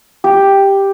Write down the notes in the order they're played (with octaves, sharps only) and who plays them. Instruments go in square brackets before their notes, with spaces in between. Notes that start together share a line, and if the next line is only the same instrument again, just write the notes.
[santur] G4